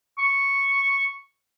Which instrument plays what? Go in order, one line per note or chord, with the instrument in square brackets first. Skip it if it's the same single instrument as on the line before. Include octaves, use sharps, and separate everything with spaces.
[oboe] C#6